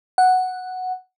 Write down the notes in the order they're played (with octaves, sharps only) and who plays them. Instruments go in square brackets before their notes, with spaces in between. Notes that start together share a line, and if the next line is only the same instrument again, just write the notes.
[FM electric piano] F#5